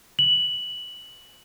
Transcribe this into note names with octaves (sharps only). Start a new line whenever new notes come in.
F#7